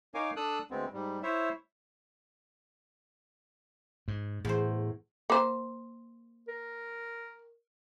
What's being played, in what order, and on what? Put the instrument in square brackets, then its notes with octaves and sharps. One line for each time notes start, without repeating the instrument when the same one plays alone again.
[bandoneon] D#4 A#4 C#5 F5 G#5 D6
D4 A4 D#6 E6 F#6
D2 G#3 B3 C4
G#2 G3
E4 C5 C#5 E5
[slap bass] G#2
[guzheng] E2 C5 [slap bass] A2
[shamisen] A#3 C5
[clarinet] A#4